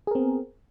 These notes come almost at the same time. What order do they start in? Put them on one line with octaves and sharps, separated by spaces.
G#4 A#4 C4 B3